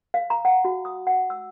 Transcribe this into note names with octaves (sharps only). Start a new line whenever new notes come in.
F5
A#5
F#5
F#4
D#6
F#5
E6